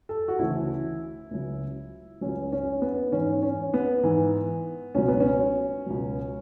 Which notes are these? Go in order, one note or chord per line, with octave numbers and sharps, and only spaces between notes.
A4
F#4
D2 C#3 E3 E4
C#2 C#3 F#3
C#2 C#3 F#3 C#4
C#4
B3
G#2 E3 C#4
C#4
B3
G#2 E3
C#2 B2 F#3 C#4
B3
C#4
C#2 B2 F#3